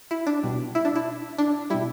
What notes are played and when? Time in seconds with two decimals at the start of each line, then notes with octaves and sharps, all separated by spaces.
0.11 E4
0.27 D4
0.43 B2 G3
0.75 E4
0.85 D4
0.96 E4
1.38 D4
1.70 B2 G3 E4